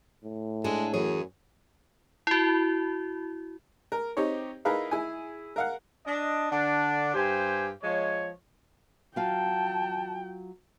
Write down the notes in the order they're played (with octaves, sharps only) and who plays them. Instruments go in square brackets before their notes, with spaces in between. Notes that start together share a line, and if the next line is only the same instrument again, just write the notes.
[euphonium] A2
[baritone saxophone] G#3 [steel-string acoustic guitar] D4 G#4 A4
[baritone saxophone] F#2 [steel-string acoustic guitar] E3 G#4 C#5
[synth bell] E4 F#4
[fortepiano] A#4
C4 D#4 G4 C#5
D#4 E4 G#4 A#4 B4 F5
E4 G#4 G#5
A#4 F5 F#5
[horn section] D4 D#5
D3 D4
G2 G4 C5 G#5
F3 G#3 C#5
[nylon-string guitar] F#3 F4 F5 [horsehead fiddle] G5 [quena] A5